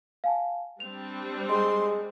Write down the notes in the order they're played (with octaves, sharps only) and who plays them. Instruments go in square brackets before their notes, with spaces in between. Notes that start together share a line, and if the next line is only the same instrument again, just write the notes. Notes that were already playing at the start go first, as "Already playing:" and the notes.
[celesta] F5 G#5 A5
[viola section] G3 C4 D4 [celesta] F7
[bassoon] G#3 [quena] C6